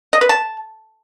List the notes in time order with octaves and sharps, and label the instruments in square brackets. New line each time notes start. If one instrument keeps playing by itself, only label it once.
[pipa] D#5
B4
A5